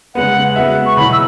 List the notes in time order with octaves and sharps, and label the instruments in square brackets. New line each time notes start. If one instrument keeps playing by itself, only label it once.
[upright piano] C#3 G#3 B3 [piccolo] F#5
[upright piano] G#3 B3 F#4 E5
[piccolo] C#6
[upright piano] B2 F#3 E4 [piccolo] B5
[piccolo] E6